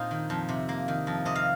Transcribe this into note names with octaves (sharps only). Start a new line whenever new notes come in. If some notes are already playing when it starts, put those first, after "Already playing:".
Already playing: A#2 C4 D#4 C5 F5
D#3
F2
C3
A#3
D#3
F2
C3 D#5
F5